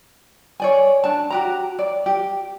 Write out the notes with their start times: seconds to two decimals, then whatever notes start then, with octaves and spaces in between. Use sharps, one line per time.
0.60 C#5 D5 G#5
1.04 D4 A5
1.30 F#4 G4 A#5
1.79 D5
2.06 G4